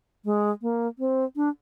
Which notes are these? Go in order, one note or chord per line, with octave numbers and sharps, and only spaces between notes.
G#3
A#3
C4
D4